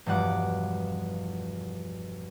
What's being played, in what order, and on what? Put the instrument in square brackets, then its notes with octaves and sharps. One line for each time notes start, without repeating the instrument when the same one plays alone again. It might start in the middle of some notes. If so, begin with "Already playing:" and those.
[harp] E1 G2 F3 F#5 D6